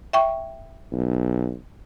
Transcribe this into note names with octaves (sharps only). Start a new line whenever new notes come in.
E5 G5 C#6
B1